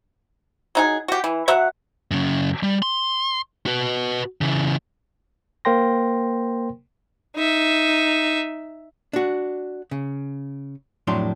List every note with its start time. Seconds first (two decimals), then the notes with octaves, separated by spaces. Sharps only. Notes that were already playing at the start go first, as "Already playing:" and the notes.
0.75 F#3 D#4 G#4
1.08 F#4 G4
1.24 E3
1.48 F#3 F#4 E5 F#5
2.11 F#2 C#3
2.63 G3
2.82 C6
3.67 F#4 B4
4.41 C#3 E3
5.65 A#3 A#4 C5 G5 C6 A#6
7.36 D#4 E5
9.13 D4 F#4
9.91 C#3
11.07 F2 A2 F#3 D4 C6